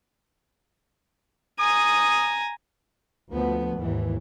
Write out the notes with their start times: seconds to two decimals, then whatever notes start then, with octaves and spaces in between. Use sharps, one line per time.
1.60 G#5 A#5 D#6
3.30 D2 F3 A3 B3
3.77 D#2 G#2 E3